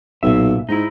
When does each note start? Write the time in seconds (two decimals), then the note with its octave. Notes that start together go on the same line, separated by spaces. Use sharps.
0.23 B1 A#2 E5
0.69 G#2 D#4 E4